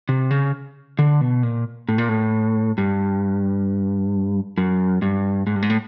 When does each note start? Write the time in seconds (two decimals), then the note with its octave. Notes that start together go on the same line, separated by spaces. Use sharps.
0.09 C3
0.31 C#3
0.99 D3
1.21 B2
1.43 A#2
1.89 A2
1.98 A#2
2.09 A2
2.78 G2
4.58 F#2
5.02 G2
5.47 G#2
5.56 G2
5.62 G#2
5.70 A2